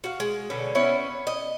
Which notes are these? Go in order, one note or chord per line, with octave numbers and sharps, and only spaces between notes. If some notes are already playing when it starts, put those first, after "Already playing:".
F#4 F5
G#3
B2 D3 C#4
B3 C#4 E4 C#5
D#5